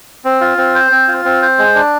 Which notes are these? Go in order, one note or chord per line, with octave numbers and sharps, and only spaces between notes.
C4
F4
C4
C5
C4
F4
C4
C5
G#3
D4